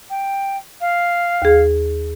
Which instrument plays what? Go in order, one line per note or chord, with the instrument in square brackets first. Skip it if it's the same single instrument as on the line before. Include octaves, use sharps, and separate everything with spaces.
[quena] G5
F5
[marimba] D#2 G#4